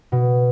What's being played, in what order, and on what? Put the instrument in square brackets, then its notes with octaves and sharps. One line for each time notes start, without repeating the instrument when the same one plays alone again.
[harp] B2